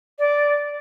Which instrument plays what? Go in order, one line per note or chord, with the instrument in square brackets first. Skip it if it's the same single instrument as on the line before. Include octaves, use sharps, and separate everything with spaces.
[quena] D5